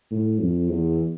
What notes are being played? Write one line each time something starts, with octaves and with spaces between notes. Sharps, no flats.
A2
F2
E2